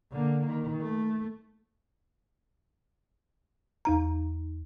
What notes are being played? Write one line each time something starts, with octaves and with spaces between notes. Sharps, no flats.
D3 A#3
D#3
A3
E2 D#4 A#5